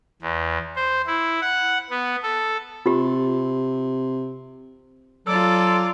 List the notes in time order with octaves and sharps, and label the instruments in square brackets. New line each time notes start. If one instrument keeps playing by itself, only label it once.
[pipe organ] E2
C5
E4
F#5
B3
A4
[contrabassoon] C3 [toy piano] F4 G4
[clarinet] F#3 [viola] F4 D5 [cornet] A4 [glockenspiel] E6